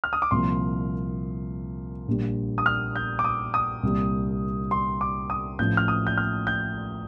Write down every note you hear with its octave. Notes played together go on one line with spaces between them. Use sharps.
F6
D#6
D6
C2 A#2 F3 C6
A#1 A#2 G3
D#6
F6
G6
D6
D#6
D#6
C2 A#2 G3
C6
D6
D#6
A1 A2 F3 G6
F6
D#6
G6
F6
G6